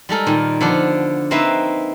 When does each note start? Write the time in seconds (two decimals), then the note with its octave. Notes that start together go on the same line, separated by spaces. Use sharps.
0.09 G3 G#3 A4 A#4
0.27 A#2 D#3
0.61 D3 F3 B3 D4
1.31 A#3 C4 D#4 B4 E5